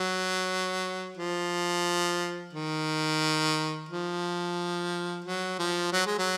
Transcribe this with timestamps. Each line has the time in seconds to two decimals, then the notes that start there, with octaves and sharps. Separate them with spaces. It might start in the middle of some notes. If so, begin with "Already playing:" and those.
Already playing: F#3
1.18 F3
2.53 D#3
3.89 F3
5.25 F#3
5.59 F3
5.92 F#3
6.06 G#3
6.19 F#3